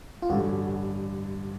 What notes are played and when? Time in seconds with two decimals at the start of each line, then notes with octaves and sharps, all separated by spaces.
0.22 F4
0.29 A1 G2 D3 F#4